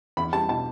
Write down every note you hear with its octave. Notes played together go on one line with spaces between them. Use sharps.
E2 B5
G3 A5
B2 A5